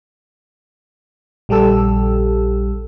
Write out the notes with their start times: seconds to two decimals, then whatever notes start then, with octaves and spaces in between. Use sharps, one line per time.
1.49 A#1 G3 G4 A4 E6